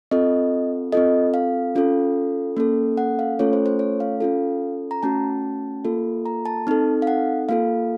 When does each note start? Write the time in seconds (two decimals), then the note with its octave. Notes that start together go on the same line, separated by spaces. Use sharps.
0.11 C4 F4 A4 D#5
0.92 C4 F4 A4 D#5
1.34 F5
1.75 C#4 F4 A4
2.57 A#3 C#4 A4
2.97 F#5
3.19 F5
3.39 A3 C#4 F4 A4 C#5
3.53 C5
3.66 C5
3.79 C#5
4.00 F5
4.20 C#4 F4 A4
4.91 A#5
5.03 A3 C#4 F#4 A5
5.85 A#3 F4 A4
6.25 A#5
6.46 A5
6.67 C4 D#4 A4
7.02 F5
7.07 F#5
7.49 A#3 F4 A4 F5